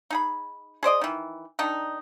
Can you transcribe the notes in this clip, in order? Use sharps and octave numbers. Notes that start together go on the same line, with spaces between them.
D#4 G#4 B5
G#4 C5 D5 D#5
D#3 E3
D#3 D4 D#4